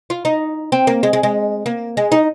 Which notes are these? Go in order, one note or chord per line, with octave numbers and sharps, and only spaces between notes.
F4
D#4
C4
A#3
G#3
G#3
G#3
A#3
G#3
D#4